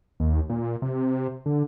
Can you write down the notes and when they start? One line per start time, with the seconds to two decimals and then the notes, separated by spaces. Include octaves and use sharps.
0.20 D#2
0.49 A#2
0.82 C3
1.46 D3